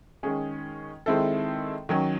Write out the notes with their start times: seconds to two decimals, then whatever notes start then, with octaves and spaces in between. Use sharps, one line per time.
0.23 D#3 G#3 C#4 G#4
1.06 D#3 G#3 C4 E4 A4
1.89 D#3 F#3 C#4